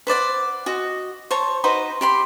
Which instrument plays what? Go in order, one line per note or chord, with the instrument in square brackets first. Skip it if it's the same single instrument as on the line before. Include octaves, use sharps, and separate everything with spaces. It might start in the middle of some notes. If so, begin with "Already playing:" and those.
[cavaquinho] B4 C5 D5 F#5
F#4 D#5
C5 C#5 A5 C#6
D#4 F#4 B4 C5
G4 B5 C6